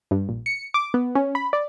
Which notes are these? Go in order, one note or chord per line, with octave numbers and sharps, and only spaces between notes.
G2
A#1
C#7
D6
B3
C#4
B5
D5